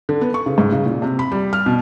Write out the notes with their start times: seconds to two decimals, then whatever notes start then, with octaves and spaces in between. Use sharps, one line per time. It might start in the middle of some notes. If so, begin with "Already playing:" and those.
0.09 D3
0.21 B3
0.34 C#6
0.46 C#3
0.58 G#2
0.72 C#3
0.86 A#2
1.02 C3
1.19 B5
1.32 G3
1.53 F6
1.66 B2